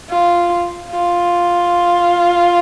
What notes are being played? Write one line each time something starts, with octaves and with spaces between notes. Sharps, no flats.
F4
F4